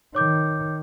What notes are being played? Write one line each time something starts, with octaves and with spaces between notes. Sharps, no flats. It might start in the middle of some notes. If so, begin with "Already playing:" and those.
D#3 C#5 D6 G6